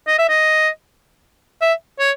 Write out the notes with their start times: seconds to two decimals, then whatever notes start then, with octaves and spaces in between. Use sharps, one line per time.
0.07 D#5
0.18 E5
0.29 D#5
1.61 E5
1.99 C#5